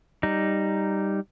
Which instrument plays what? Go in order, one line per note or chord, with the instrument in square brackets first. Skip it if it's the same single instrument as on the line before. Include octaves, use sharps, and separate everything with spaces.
[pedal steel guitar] G3 D#4